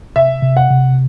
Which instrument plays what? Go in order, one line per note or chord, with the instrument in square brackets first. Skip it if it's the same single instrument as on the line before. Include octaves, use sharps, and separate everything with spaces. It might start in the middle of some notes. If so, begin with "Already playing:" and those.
[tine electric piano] C3 [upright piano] E5
[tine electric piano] C3
[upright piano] F#5
[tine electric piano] C3